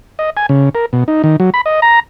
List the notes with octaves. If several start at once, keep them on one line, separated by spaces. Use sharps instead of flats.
D#5
G#5
C#3
A#4
B2
D#4
D#3
F#3
B5
D#5
A#5